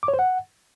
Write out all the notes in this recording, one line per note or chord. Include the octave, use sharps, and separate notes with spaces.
D6
C#5
C5
F#5